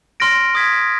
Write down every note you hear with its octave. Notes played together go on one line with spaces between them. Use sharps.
C6 F6 A#6 D7
D#6 G#6 B6